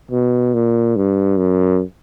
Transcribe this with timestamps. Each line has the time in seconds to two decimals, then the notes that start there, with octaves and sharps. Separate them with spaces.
0.11 B2
0.54 A#2
0.96 G2
1.38 F#2